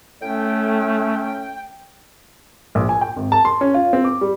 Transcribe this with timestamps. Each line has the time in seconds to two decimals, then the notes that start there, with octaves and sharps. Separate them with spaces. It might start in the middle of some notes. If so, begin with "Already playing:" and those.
0.22 A2 A3 C#4 G5
2.75 A#1
2.89 G#5
3.01 G5
3.17 G#1
3.32 A5
3.45 C6
3.61 C#4
3.74 F4
3.93 C4
4.05 D6
4.21 G3